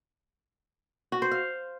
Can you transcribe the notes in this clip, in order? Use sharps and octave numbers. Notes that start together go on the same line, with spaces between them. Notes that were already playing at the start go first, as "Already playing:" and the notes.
F#4
C5
F5